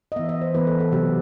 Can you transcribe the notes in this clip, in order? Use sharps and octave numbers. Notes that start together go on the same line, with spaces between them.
D#5
E3 B3 E5
D#5
C5
E3 B3 B4
A4
A4
C3 F#3 B3 G4